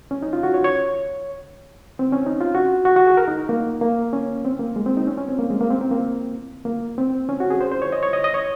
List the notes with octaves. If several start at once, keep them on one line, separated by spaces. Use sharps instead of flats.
C#4
D#4
F4
F#4
C#5
C#5
C4
C#4
D#4
F4
F#4
F#4
F#4
G#4
A#4
D#4
A#3
A#3
C#4
C4
A#3
G#3
C4
D#4
C#4
C#4
C4
A#3
G#3
A#3
C4
C4
A#3
A#3
C4
C#4
F#4
G#4
C5
C5
C#5
D#5
C#5
D#5
D#5
C#5